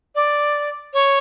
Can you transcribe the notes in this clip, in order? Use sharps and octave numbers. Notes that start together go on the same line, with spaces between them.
D5
C#5